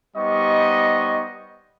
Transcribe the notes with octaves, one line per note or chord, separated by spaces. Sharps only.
G3 B3 D#4 C5 D#5 C#6